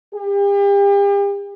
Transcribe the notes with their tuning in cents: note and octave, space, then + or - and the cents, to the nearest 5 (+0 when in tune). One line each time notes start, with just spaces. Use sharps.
G4 +40